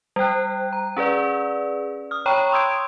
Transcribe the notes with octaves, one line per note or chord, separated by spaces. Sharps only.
G3 C5 G5 F#6
A#5
C#4 G#4 B4 D5
D#6 F6
C#5 G5 A#5 B5 C#6
C6 D#6 E6 G6 G#6 D7